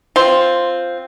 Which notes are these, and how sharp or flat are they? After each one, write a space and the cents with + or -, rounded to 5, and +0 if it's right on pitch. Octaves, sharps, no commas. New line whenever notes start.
C4 +0 F4 +0